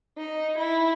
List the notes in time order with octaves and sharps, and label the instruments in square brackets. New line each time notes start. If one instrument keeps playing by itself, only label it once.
[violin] D#4
E4